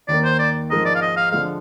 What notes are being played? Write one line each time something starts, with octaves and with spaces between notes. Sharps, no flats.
D#2 D#3 A#3 D5
C5
D5
G#2 F3 G#3 D#4 A#4 D#5
D5
F5
D#5
F5
D3 F3 G#3 F5